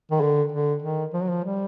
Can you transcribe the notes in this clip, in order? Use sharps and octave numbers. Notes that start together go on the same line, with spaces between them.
D#3
D3
D3
D#3
F3
F#3
F3
G3